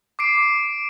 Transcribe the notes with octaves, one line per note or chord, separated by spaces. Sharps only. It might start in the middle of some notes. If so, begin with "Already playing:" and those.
D6 C7 D7